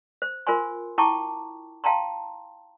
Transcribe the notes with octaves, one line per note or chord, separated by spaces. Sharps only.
C5
F4 A#4 C5 G#5 C6
E4 G5 A5 A#5 C#6 D6
F5 G5 A5 A#5 C6